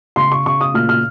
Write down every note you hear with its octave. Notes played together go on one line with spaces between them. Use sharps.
C#3 C6
C#6
C#3 C#6
D#6
A#2 F6
F6